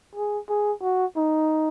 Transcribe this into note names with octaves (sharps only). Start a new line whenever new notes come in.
G#4
G#4
F#4
D#4